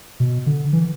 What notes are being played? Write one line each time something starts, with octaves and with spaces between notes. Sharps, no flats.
B2
D3
E3